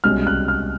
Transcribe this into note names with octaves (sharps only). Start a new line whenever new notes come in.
C2 B2 G#3 C#4 F6
F#6
F6